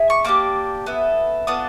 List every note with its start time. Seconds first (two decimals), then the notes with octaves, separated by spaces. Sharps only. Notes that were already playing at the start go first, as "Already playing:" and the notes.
Already playing: E4 G#4
0.10 C#6
0.25 A#3 D4 G4 D6
0.86 B3 E4 A4
1.47 B3 D4 F4 A4 D#6